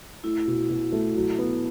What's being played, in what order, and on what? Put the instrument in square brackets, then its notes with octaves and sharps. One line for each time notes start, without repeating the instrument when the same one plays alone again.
[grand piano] A3 [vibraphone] E4
[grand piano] B2
B2
A3
F#3
B3